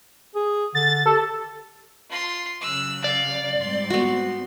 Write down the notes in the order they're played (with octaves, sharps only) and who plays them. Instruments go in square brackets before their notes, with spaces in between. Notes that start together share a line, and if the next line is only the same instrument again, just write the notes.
[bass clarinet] G#4
[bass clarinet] D3 [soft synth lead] A6
[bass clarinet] G4 [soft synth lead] A4
[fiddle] F4 C6
[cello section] C#3 F#3 [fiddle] E6 F#6
[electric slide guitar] D5 [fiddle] F5
[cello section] G#2 G3 C4 [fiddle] C6
[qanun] B3 F#4